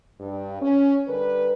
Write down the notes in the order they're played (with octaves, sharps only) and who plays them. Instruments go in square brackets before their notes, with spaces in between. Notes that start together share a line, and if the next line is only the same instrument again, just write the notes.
[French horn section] G2
C#4
D3 G3 A#4 B4